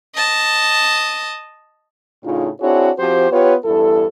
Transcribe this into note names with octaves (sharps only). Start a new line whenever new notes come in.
D#5 A5
A2 C#3 D4 D#4 F4
C4 D4 E4 F#4 G#4 C#5
F3 C4 F#4 G4 C5
B3 F4 G4 B4 C#5
E2 G2 E4 A4